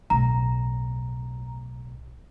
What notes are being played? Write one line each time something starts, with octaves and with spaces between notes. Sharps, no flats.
B1 A2 A#5